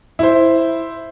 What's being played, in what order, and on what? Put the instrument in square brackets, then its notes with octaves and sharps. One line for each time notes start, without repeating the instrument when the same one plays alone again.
[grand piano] E4 C5